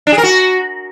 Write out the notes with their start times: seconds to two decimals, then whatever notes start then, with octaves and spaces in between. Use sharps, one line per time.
0.07 D4
0.12 G#4
0.18 A#4
0.23 F#4